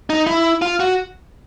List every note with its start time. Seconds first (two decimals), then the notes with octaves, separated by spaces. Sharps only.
0.10 D#4
0.27 E4
0.62 F4
0.80 F#4